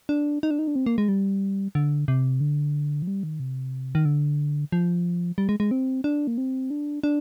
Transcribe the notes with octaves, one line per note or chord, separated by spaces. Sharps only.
D4
D#4
D4
D#4
D4
C4
A#3
G#3
G3
D3
C3
D3
F3
G3
D#3
C3
D#3
D3
F3
G3
G#3
G#3
C4
D4
A#3
C4
D4
D4